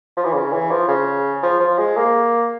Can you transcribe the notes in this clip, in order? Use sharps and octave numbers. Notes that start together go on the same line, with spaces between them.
F3
E3
C#3
E3
F3
C#3
F3
F3
G#3
A#3